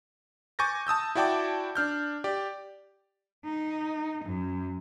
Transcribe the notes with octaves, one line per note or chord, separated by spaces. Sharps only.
G#5 C#6 D6 G6 A6 A#6
A5 D#6 E6 G6
E4 F#4 D5 G5 A5 D6
D4 F6 G6
G4 D5
D#4
F#2